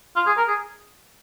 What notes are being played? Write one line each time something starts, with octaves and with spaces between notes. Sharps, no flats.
F4
G#4
A#4
G#4